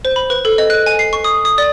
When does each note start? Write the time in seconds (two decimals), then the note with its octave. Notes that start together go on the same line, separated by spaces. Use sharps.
0.05 C5
0.16 B5
0.30 B4
0.45 A4
0.58 D#5
0.70 F#6
0.86 G#5
0.99 C7
1.13 C#6
1.24 D#6
1.45 D#6
1.58 D5